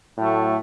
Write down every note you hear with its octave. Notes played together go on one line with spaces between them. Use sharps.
A2 F#3 A3